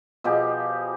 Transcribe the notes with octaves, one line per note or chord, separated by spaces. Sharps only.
B2 F3 G4 G#4